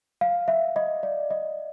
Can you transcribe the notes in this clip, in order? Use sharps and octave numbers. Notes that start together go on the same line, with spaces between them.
F5
E5
D#5
D5
D#5